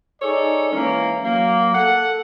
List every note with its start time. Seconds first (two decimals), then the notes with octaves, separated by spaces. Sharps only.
0.21 D#4 G#4 A4 C#5 D5
0.72 E3 G#3 A#3 C#4 A#4
1.22 F#3 A#3
1.74 A4 F#5